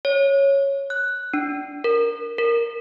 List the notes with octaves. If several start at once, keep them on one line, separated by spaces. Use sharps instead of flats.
C#5
F#6
D4
A#4
A#4